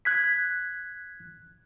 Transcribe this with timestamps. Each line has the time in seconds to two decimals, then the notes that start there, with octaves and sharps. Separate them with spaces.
0.05 F#6 G#6 B6